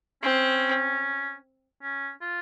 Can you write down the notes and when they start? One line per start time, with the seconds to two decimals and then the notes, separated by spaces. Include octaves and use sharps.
0.23 C4 C#4
1.82 C#4
2.21 F4